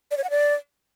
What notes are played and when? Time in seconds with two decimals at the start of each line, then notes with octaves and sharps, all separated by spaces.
0.11 D5
0.17 C#5
0.24 F#5
0.30 D5